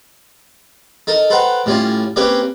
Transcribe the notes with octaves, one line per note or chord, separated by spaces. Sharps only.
D#4 A4 A#4
A4 B4 C5 F#5 G5 A#5
A2 G3 C#4 F4
A#3 C4 C#4 G4 B4 C#5